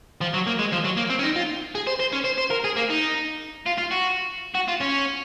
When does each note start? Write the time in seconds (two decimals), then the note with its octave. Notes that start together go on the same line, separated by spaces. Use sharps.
0.21 F3
0.34 F#3
0.47 A#3
0.59 G#3
0.73 F3
0.85 F#3
0.97 A#3
1.10 C4
1.19 C#4
1.23 D#4
1.36 F4
1.75 G#4
1.87 C5
2.00 C5
2.13 C#4
2.25 C5
2.38 C5
2.51 A#4
2.64 G#4
2.76 A#3
2.90 D#4
3.66 F4
3.78 F4
3.91 F#4
4.55 F#4
4.68 F4
4.81 C#4